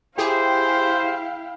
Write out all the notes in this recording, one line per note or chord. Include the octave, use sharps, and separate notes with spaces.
E4 G4 G#4 C5 F5 G5